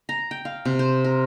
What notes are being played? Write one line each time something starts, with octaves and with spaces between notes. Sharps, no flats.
A#5
G5
F5
C3
C5
A#4